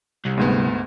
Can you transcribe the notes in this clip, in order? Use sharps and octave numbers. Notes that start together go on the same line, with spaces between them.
C2
D2 G#2 B3